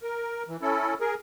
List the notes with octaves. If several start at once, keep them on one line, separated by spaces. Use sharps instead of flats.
A#4
E3
C#4 E4 A4
G#4 A#4